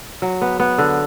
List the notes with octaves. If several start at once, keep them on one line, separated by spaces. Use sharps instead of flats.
F#3
B3
B3
D3